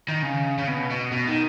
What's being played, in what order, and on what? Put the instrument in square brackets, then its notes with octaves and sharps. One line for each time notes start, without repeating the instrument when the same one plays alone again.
[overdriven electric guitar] D#3
C#3
C#3
B2
B2
B2
D#3